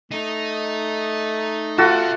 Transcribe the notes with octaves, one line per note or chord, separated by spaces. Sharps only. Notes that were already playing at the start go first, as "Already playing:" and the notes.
A3 D#4
F4 F#4 A4 C5 E5 F#5